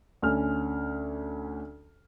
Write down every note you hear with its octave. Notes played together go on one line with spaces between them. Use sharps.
D2 C#4 F6